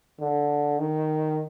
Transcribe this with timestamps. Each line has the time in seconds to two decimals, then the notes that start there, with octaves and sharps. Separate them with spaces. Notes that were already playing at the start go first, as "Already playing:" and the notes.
0.20 D3
0.79 D#3